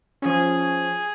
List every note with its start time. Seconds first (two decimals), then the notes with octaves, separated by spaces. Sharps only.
0.22 F3 C#4 G#4